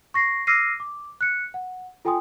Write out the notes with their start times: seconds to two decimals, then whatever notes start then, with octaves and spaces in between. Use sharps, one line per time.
0.14 C#6 A#6 C7
0.47 D6 E6 F6 A#6 C7 D#7
0.80 D6
1.21 F#6 C#7
1.54 F#5
2.05 F4 A4 G5 G#5 C6 D#6